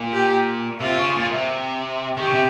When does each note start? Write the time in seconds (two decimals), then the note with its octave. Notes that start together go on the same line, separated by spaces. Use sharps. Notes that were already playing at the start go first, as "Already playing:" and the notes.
Already playing: A#2
0.13 G4
0.81 C3 F4
0.98 C#3
1.16 A#2
1.32 C3
2.17 D#3 G4
2.25 C#3
2.33 C3